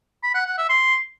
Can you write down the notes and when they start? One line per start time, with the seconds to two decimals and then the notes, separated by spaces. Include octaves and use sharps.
0.23 B5
0.35 F#5
0.46 F#5
0.58 E5
0.69 C6